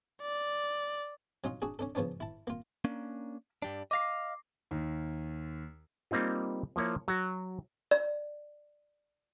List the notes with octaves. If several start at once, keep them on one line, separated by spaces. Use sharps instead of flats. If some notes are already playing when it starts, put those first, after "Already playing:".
D5
F#3 C#4 D#4 F4
D4 F#4 G#4
C#4 D4 A4
C#3 F3 B3 C#4 D4
E4 A5
A#3 F4
A#3 C#4 D4
G2 G3 D4
D#5 F5 D6 A#6 C7
D#2 D#3
G3 A#3 C4 D#4 F4
F3 A#3 E4 C#5
F#3 F#4
D5